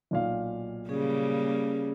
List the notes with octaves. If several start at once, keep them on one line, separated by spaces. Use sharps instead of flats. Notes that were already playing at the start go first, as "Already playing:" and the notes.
B1 A#2 F5
C#3 G3 A#3 C#4 G#4